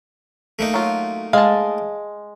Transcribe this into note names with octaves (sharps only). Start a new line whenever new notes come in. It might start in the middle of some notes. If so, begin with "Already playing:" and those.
A3 A#3 D#4
F#3 F4
G#3 F5 A5